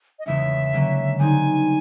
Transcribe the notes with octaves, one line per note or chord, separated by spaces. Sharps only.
D#5
E2 C#3 E3 G#3 C#4 E5
D3 F#3 A#3 C#4
D3 G3 C4 D#4 G#5